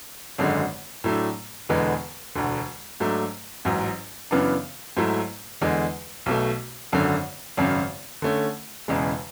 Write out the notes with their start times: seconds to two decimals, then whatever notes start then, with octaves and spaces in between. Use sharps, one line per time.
0.38 G#1 F#2 D3 G#3
1.04 A2 F#3 A3 D4
1.69 E1 E2 D3 G#3 B3
2.35 E1 D2 D3
3.00 G#2 F#3 A3 D4
3.65 A1 G#2 F#3
4.31 F#2 C#3 E3 B3 D4
4.97 G#2 F#3 A3 E4
5.61 E2 D3 G#3
6.26 B1 B2 A3
6.92 G#1 F#2 D3
7.57 G#1 F#2 C#3
8.22 D3 A3 C#4
8.88 E1 E2 C#3 G#3